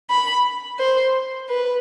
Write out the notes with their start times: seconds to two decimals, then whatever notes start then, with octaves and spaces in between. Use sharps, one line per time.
0.10 B5
0.79 C5
1.49 B4